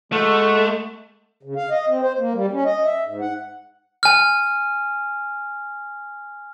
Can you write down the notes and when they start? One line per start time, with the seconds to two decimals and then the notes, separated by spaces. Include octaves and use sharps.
0.12 G#3 A3 F#4
1.43 C#3
1.56 F5
1.70 D#5
1.88 C4
2.01 C5
2.18 A#3
2.34 G3
2.53 C#4
2.65 D#5
2.85 E5
3.06 G#2
3.21 F#5
4.03 G#5 F6